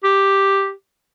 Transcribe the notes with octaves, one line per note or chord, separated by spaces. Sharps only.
G4